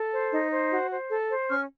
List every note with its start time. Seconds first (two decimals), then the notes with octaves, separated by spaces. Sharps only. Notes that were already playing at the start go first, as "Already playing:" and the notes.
Already playing: A4
0.12 C5
0.32 D#4
0.51 C5
0.71 F#4
0.90 C5
1.10 A4
1.29 C5
1.49 C#4 C#6 F6